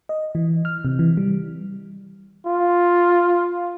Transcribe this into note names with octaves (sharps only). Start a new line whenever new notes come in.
D#5
E3
F6
C3
E3
G3
F4